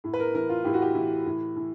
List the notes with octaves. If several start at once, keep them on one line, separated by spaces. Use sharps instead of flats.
A2
B4
A#4
E3 A#4
F4
A2 G4
F#4
G4
E3
A2
E3